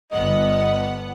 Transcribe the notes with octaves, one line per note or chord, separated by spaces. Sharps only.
G1 B3 D#5 F#5